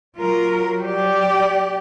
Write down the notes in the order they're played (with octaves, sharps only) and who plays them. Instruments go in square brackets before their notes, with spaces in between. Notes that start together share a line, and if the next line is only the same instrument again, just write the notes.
[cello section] F#3 [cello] F4 A#4
[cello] G4 D5